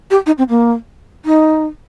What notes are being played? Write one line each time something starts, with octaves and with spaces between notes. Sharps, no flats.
G4
D#4
C4
A#3
D#4